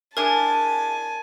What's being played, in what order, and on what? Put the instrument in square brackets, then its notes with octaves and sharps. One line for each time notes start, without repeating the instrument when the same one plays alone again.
[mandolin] D4 E4 G#4 [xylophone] A#4 [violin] G#5 A5